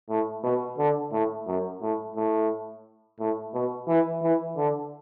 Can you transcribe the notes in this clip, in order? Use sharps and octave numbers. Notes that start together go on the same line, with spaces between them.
A2
B2
D3
A2
F#2
A2
A2
A2
B2
E3
E3
D3